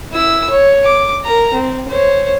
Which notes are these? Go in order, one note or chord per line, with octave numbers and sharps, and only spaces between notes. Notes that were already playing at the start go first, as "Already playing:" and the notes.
E4 E6
C#5
D6
A#4 A#5
C4
C5 C#5